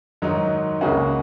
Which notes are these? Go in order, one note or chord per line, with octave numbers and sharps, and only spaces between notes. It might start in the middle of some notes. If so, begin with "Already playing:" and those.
G#2 D#3 F#3 D#4
C#2 C#3 A#3 C#4 F#4